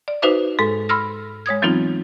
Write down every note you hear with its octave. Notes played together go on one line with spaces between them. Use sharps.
D5
D#4 F#4 B4 C5 E5 D6
G#2 G#3 A4
B5 C6 E6 F6 A#6
G#3 C#5 D#6 G#6
E3 F#3 B3 C4 D#4 F4